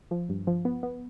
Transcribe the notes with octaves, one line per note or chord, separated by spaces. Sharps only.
F3
G2
F3
B3
B3